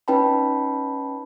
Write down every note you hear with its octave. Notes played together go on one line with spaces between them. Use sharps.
C#4 D#4 B4 G5 A5 B5